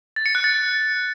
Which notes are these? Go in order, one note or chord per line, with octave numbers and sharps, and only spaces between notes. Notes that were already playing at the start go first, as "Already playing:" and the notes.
A6
C#7
F#6
A6